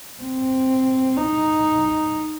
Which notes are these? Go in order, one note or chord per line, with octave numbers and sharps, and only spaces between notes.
C4
D#4